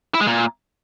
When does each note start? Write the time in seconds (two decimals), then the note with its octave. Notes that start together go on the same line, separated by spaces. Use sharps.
0.14 E4
0.21 G#3
0.27 A#2